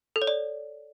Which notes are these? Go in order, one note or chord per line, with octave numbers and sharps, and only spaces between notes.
A4
C#5
D5